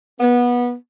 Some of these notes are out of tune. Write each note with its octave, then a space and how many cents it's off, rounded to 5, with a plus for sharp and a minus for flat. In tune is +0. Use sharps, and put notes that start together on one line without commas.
B3 -20